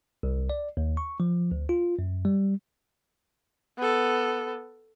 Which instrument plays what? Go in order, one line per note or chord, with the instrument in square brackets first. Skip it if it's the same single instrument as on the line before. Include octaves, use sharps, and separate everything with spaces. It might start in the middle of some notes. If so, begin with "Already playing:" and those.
[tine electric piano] C2
D5
D#2
C#6
F3
D2
F4
F#2
G3
[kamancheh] B3 A4